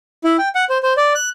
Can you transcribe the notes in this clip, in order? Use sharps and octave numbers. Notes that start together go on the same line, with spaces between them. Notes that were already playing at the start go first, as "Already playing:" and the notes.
E4
G5
F#5
C5
C5
D5
F#6